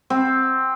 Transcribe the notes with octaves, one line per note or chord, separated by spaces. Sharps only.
C4